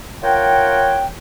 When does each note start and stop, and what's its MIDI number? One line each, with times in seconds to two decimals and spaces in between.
0.23 1.07 65
0.23 1.07 70
0.23 1.07 73
0.23 1.07 78
0.23 1.07 79